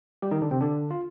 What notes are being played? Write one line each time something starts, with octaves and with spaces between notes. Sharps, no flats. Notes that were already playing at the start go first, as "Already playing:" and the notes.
G3 G4
D#3 D#4
D3 D4
C3 C4
D3 D4
F4